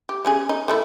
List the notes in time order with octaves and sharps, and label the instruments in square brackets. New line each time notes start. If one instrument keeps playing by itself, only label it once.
[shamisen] G4
G3 C#4 G#4
D#4
D#3 A3 E4